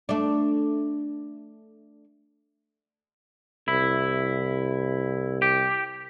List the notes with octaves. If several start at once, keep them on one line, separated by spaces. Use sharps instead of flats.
A3 D4
C2 E4
G4